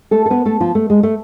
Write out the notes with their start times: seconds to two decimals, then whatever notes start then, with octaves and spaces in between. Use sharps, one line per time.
0.11 A3 A4
0.26 A4
0.30 B3 B4
0.45 A3 A4
0.60 F3 F4
0.75 A3
0.90 G#3
1.03 A3